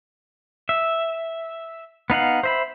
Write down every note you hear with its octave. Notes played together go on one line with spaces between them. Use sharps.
E5
B3 D#4 F5 F#5
C5 E5 B5